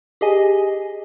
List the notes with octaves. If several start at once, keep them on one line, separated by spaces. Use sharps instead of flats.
G4 G#4 D#5 G#5